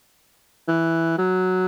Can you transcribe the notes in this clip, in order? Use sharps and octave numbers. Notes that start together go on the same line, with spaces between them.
E3
F#3